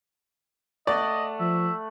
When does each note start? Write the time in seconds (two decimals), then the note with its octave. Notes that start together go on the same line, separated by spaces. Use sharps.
0.87 A3 D5 D#5 F#5
1.40 F3 E5